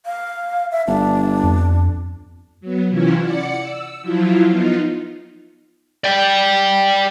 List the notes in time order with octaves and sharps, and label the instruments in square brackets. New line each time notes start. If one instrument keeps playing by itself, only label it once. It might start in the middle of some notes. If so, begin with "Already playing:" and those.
[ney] F5
E5
[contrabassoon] G1 [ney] D4
[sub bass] F2
[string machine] F#3 B3
C3 E3 C#4 E4 F4
D5 F#5 C#7
E6
F3 F#3 E4 F4
B3 D#4 F4
[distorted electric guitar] D5 G5